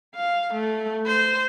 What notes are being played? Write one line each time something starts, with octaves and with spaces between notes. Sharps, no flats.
F5
A3
C5